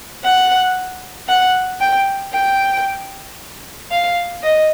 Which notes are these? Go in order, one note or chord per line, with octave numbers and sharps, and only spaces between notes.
F#5
F#5
G5
G5
F5
D#5